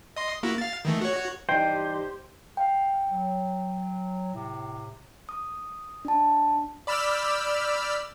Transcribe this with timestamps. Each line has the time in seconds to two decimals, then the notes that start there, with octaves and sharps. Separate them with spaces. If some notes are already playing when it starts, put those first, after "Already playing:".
0.16 D#5 C6
0.43 A#3 E4 F#4
0.58 F5 A6
0.85 D#3 E3 A3
1.01 F#4 C#5
1.49 G2 E3 D#4 G4 C5 G5
2.57 F5 G5
3.09 F#3
4.33 A2 C3
5.29 D#6
6.05 D4 A5
6.87 D5 B5 E6 F6 G6 B6